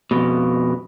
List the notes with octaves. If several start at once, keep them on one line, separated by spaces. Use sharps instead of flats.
F2 B2